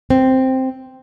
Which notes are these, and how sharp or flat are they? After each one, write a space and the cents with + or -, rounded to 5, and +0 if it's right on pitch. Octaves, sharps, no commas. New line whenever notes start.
C4 +0